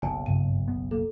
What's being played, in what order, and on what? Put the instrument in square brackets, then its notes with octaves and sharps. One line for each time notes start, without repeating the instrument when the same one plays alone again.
[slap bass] F#1 B1 [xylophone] G#5 A5
[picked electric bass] G2 C#3 [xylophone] D#7
[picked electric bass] B3
[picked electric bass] A#3 [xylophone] A4